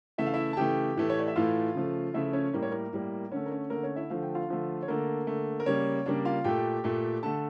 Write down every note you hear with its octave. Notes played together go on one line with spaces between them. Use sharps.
C#3 E3 A3 E5
F5
E4 E5
A5
C#3 E3 A3 G4 G5
A2 E3 A3
C#5
D5
E5
A2 E3 A3 F4 F5
C#3 F3 A3
C#3 F3 A3 E4 E5
C#4 C#5
A2 G3 A#3 A#4
C#5
A#3 A#4
A2 G3 A#3
D3 A3 C#4 C#5
A#4
C#4 C#5
D3 A3 A#3 A#4
C#4 C#5
E4 E5
D3 F3 A3 F5
G5
F4 F5
D3 F3 A3
C#5
D3 A3 A#3 A#4
D3 A3
A#4
C#3 G3 A#3 C#4 C#5
C#3 G3 A#3 D4 D5
F4 F5
A#2 A3 G4 G5
A#2 A3
D3 A3 A4 A5